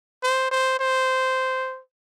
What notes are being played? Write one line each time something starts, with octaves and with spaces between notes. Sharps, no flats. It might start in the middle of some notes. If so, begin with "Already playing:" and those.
C5
C5
C5